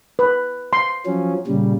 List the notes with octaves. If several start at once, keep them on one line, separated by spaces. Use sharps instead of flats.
B4
C6
F3 F#3 C#4
A#2 C#3 G3